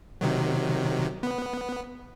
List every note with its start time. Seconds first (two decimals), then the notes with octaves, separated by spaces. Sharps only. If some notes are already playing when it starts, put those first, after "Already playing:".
0.21 C3 D#3 F#3
1.23 B3